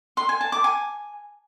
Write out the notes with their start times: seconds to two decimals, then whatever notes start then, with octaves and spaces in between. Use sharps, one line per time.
0.17 C6
0.29 G#5
0.41 A5
0.52 D6
0.64 G#5